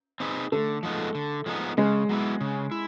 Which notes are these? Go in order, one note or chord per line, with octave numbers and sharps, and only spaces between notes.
C4 D#4 G#4 B4
D3 A3
F3 G#3 B3 D#4
D3
F3 G#3 B3 D#4
C#3 G#3
F#3 B3 E4
C#3
E4